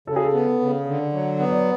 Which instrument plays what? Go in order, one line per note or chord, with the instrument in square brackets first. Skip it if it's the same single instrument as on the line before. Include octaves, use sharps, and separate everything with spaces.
[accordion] C#3 [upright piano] A4
[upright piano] G#4
A4
[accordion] B3
C#3
D3
F#3
B3
[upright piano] D5